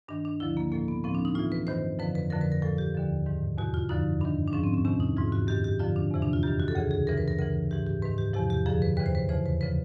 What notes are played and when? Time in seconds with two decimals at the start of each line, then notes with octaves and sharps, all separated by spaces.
0.08 G2 D#3 D4
0.25 D4
0.40 D2 D3 F3 E4
0.57 A#3
0.72 A2 F3 A#3
0.88 B3
1.04 A2 F3 C4
1.15 D4
1.25 D#4
1.35 A2 E3 F4
1.52 B4
1.67 G2 D#3 C5
1.99 F2 D3 F3 B4
2.15 B4
2.30 F2 D3 F3 A#4
2.41 B4
2.52 A#4
2.62 A2 F3 A4
2.78 G4
2.95 D#2 D3 F3
3.27 G#2 D#3
3.58 E2 B2 F#4
3.74 F4
3.89 F#2 D3 F3 D#4
4.21 G2 D#3 D4
4.48 D4
4.53 G#2 F3 C#4
4.64 C4
4.74 C#4
4.85 E2 C3 D#3 C#4
5.00 D#4
5.17 G#2 E3 F4
5.32 F#4
5.48 F#2 D#3 G4
5.64 G4
5.79 F2 D3 F3 F4
5.96 D4
6.11 E2 C3 E3
6.22 D4
6.33 F4
6.43 F#2 D#3 G4
6.60 F#4
6.68 A4
6.75 D2 C#3 E3 G#4
6.91 G#4
7.07 F#2 C#3 E3 A#4
7.18 B4
7.28 A#4
7.39 D2 C#3 E3 A#4
7.71 G#2 E3 G4
7.87 G4
8.02 G#2 D#3 B4
8.18 G4
8.33 E2 C3 F3 G4
8.50 G4
8.66 F#2 D3 F3 G#4
8.82 B4
8.97 D#2 C#3 E3 B4
9.06 C5
9.15 B4
9.29 E2 C#3 E3 C5
9.46 B4
9.61 C#3 F3 B4